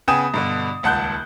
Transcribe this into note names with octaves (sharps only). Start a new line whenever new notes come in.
C#3 B3 G5 G#5 D#6 E7
G2 B2 D3
D#1 C#2 F#5 A5 F#6 G6